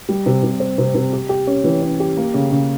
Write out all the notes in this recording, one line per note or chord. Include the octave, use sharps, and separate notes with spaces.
G3
C3
C3
C4
C3
C3
G4
G4
C#4
E3
C#4
G4
A#3
C#3
C#3